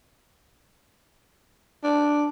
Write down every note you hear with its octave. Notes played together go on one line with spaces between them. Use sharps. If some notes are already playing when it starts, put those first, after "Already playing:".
D4